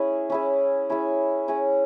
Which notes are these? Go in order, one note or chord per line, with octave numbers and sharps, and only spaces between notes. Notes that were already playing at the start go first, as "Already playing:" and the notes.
Already playing: C#4 E4 G#4
C#4 E4 G#4
C#4 E4 G#4
C#4 E4 G#4